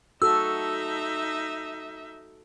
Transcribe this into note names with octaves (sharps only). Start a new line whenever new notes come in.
D#4 F#4 A4 E5 E6